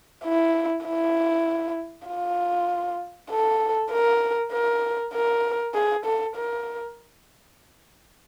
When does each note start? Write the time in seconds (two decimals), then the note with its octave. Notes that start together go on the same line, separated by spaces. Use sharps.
0.25 E4
0.86 E4
2.08 F4
3.31 A4
3.92 A#4
4.53 A#4
5.13 A#4
5.75 G#4
6.05 A4
6.36 A#4